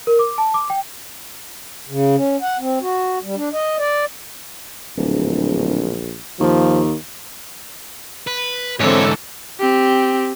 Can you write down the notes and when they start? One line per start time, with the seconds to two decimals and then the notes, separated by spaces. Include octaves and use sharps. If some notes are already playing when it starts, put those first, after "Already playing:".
0.07 A#4
0.19 D6
0.38 A5
0.54 D6
0.70 G5
1.89 C#3
2.16 C#4
2.42 F#5
2.59 C4
2.81 F#4
3.23 G3
3.36 D4
3.53 D#5
3.78 D5
4.97 D1 A#1
6.40 D#2 F3
8.27 B4
8.80 G#2 D3 E3 C4 A4 C#5
9.60 C4 G4